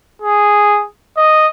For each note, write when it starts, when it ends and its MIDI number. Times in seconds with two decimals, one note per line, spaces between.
0.22 0.83 68
1.17 1.47 75